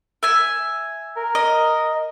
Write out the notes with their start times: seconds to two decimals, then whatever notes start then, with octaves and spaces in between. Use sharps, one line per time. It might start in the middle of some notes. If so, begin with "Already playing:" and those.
0.23 E5 G#5
1.17 A#4
1.35 D#5